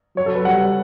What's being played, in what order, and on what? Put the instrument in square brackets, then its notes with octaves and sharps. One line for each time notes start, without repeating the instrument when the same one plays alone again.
[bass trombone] F#3 [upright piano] C#5
[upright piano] A4
B4
[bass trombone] G3 [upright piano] F#5